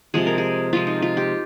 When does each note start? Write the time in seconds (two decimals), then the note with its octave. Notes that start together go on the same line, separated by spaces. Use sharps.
0.14 C3 F3 G#3 G#4
0.27 A#4
0.38 G#4
0.73 C3 F3 G#3 F4
0.87 D#4
1.02 F4
1.17 G4